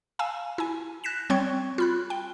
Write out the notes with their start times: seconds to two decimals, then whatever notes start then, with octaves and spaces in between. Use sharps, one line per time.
0.19 F5 G#5 A5 E6
0.58 E4 G#5
1.04 F#6 A#6 B6 E7
1.30 G3 C4 C#5 G5 C#6 G#6
1.78 F4 B5 F#6
2.10 G5